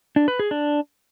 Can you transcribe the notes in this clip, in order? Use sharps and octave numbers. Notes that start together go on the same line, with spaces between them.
D4
B4
G#4
D4